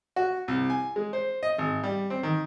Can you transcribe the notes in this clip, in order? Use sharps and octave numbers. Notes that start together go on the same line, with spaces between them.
F#4
C2
G#5
G#3
C5
D#5
G#1
G3
C4
D#3